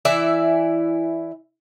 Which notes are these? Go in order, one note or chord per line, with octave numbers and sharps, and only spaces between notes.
E3 E4 D5 E5